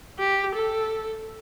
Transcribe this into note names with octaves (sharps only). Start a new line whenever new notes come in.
G4
A4